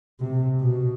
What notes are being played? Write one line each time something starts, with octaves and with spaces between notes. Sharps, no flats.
C3
B2